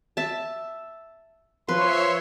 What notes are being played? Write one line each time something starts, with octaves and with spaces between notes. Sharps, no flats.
E5 A5
F3 B4 C#5 E5 C6